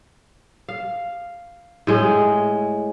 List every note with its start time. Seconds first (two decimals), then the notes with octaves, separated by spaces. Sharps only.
0.68 F5
1.87 A2 G#3